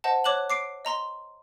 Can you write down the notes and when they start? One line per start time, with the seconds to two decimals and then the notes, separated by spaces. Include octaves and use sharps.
0.04 C5 D#5 F#5 A5
0.24 C#5 D6 F#6 E7 F#7
0.50 D6 C7 D7
0.85 D#5 A#5 C6 G7